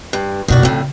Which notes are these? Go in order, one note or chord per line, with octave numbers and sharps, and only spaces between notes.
G2
F#1 B2 D#3 F#4 D5
F2 A2 C#3